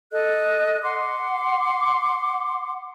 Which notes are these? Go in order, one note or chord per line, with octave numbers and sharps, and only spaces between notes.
A4 D#5 F#6
F#5 C6 D6